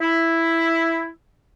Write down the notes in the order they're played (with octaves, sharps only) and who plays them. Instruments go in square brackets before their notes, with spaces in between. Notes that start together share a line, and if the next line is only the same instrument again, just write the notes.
[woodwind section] E4